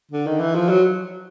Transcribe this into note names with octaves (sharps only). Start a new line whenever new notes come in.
D3
D#3
E3
F3
F#3